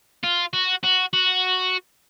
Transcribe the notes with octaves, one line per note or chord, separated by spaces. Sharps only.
F4
F#4
F#4
F#4